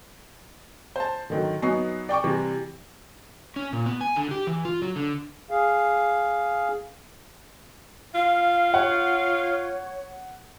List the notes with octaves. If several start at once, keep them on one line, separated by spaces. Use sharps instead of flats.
C5 A5
D3 D#3 F#3
F#3 B3 D#4 G#5 C#6 C7
D5 G5 C#6 D6
C3 E3 G3
C#4
A#2
B3
G#5
D3
G4
E3
F4
F#3
D3
G#4 F5
F4 F5
C#5 F#5